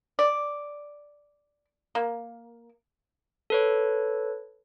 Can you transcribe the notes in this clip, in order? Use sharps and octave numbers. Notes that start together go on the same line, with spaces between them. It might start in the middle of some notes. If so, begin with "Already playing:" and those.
D5
A#3
A4 B4 C#5